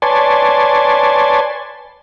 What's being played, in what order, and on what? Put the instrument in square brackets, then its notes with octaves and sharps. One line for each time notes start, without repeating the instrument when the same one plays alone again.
[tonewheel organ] B4 C#5 D5 G#5 A5 C6